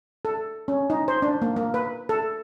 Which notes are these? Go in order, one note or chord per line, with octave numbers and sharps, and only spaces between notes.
A4
C#4
D#4
C5
D4
A#3
A#3
B4
A4